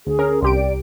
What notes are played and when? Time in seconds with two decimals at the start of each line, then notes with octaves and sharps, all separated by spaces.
0.07 D2 G#4
0.19 C#4 A#4
0.42 C2 G4 C6 D7
0.55 D5